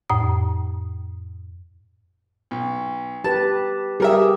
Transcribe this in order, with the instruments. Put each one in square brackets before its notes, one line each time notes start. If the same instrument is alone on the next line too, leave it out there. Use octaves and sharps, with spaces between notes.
[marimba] F2 A2 D#6
[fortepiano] B1
[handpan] G4 B4 [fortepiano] A5
[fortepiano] G3 A#4 E5 [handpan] G4 G#4